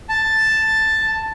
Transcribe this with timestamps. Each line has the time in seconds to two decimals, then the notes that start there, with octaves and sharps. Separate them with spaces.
0.09 A5